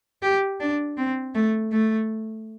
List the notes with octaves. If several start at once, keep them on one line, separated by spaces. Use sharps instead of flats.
G4
D4
C4
A3
A3